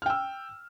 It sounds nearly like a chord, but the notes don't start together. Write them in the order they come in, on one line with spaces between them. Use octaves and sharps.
F6 G5 E6